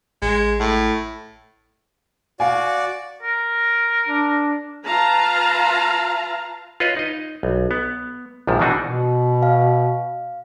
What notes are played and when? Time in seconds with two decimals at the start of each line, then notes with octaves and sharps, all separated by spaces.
0.22 A1 G#3
0.59 A2
2.40 F#4 D5 F5 G#5
3.23 A#4
4.08 D4
4.86 F4 B4 F5 A5 A#5
6.80 F4 B4 C#5 D#5
6.97 D#4 D#5
7.43 B1
7.71 B3
8.47 A#1 G#2 C3 F3
8.59 B2 D#3 E3 D4 D#4 F#4
8.83 B2
9.43 F5